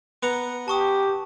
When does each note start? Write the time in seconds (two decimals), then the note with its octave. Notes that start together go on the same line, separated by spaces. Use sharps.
0.23 B3 F#5 A#5
0.68 G4 A5 C#6 D#6